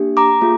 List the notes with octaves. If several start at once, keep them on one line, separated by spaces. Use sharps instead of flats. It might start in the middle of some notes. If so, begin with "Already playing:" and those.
Already playing: A#3 D4 G4
A#5 D6
A#3 F4 G#4